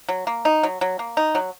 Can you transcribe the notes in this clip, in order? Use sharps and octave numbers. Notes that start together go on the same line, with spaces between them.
F#3
A#3
D#4
F#3
F#3
A#3
D#4
F#3